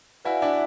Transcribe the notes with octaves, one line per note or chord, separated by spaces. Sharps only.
E4 F#4 B4 D5 F5 G#5
D4 E4